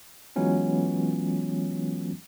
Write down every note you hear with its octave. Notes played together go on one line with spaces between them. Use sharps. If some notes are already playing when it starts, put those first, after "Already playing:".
E3 F#3 G#3 B3 C#4 F4